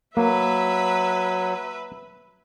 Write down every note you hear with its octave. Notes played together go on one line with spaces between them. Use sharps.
F#3 A#3 B4 E5